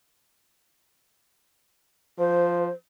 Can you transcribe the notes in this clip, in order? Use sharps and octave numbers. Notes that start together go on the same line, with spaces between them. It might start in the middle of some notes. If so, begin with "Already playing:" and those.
F3 C5